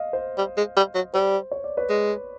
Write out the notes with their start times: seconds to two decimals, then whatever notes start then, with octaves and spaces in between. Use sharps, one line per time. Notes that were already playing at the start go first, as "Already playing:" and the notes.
Already playing: D#5 F5
0.13 C5
0.38 G3
0.57 G#3
0.77 G3
0.95 F#3
1.13 G3 C5
1.52 C#5
1.64 D5
1.77 B4 C#5
1.89 G#3